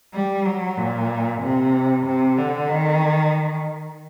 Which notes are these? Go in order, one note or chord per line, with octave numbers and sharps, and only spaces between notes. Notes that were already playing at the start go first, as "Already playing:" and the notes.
G3
F#3
A#2
C3
C3
D3
D#3